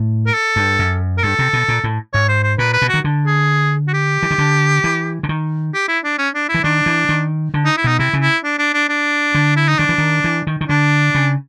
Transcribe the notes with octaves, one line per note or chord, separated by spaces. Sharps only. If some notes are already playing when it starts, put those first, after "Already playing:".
Already playing: A2
A#4
A4
G2
F#2
A#4
G2 A4
C3
B2
A#2
A2
G#2 C#5
C5
C5
A#2 B4
B4
B2
D#3 F#4
D3
G#4
F#4
G4
E3
D#3
D3
E3
D3
D#3
G4
E4
D4
C#4
D4
E4
E3
D#3 D4
E3
D#3
D3
D#4
E4
B2 D#4
C3 E4
C#3
E4
D4
D4
D4
D4
D3
E4
D#4
D#3 D4
E3
D#3
E3
D#3
D#3
D3 D4
C#3